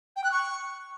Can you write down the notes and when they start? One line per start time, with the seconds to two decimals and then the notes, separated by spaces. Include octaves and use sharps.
0.16 G5
0.24 F#6
0.32 C#6